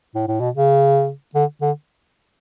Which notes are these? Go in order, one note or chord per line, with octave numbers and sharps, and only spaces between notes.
A2
A2
B2
C#3
D3
D3